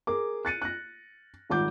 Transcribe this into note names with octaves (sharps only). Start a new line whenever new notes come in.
G#4 A#4 D6
F#6 A6 C#7 D#7
F#6 A#6
D#1 G#1 F#5 D6 G6